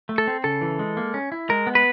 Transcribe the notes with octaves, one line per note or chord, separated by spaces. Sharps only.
A3
A4
C4
C#3 A4
E3
G#3
A#3
C#4
E4
G#3 A#4
B3
B4